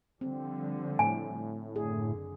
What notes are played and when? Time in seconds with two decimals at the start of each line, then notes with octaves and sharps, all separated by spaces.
0.21 D3 F3 G3 C4
0.99 A2 G#5
1.76 F#1 D3 G#4